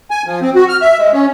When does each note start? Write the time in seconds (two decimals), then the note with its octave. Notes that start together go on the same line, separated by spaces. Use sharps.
0.11 G#5
0.27 F3
0.42 C4
0.55 F#4
0.69 F6
0.81 E5
0.99 G#3
1.13 C#4